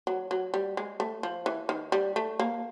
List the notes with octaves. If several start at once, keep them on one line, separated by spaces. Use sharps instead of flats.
F#3
F#3
G3
G#3
A3
F3
E3
D#3
G3
A3
A#3